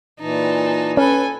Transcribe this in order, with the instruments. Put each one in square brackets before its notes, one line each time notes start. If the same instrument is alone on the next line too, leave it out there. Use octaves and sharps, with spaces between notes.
[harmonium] A#2 E3 [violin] D#4 A5
[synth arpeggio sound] C#4 [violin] A4 G#5 [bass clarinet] B4